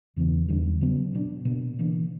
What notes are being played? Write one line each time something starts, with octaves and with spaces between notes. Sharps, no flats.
E2 C#3 E3 B3
E2 D3 G3
C#3 F#3 B3
B2 F#3 B3 D4
B2 A#3 D4
C#3 E3 A#3 D4